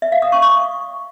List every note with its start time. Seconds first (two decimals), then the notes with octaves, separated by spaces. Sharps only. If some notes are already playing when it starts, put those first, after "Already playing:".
0.02 E5
0.12 F5
0.22 D#6
0.32 C#6
0.42 C#6